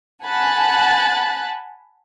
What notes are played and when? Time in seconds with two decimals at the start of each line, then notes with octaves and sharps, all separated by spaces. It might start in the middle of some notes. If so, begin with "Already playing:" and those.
0.24 F#5 G#5 A5 B5 F#6 A6